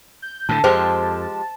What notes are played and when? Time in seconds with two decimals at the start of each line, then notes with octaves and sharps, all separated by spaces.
0.22 G6
0.49 A2 D3 A5
0.64 F2 F3 G#3 G4 C5